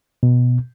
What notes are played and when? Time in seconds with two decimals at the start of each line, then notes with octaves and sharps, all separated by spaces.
0.23 B2